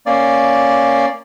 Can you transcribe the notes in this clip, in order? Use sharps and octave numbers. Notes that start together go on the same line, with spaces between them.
A#3 C#4 D5